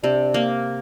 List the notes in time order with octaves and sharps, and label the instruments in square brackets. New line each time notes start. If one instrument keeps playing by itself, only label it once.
[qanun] C3 [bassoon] D4
[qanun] A#3